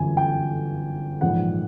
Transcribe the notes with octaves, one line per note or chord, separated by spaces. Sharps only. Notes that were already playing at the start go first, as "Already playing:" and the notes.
Already playing: G1 F#2 C#3 E3 G#5
G5
A#1 G#2 E3 F#5